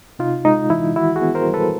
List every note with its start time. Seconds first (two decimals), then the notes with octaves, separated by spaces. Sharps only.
0.19 C3 D#4 F4
0.45 G#3 D#4
0.70 E3 E4
0.96 D#3 E4 F#4
1.16 F#4 G#4
1.21 B3
1.35 A#4 C5
1.47 G3
1.54 A4 B4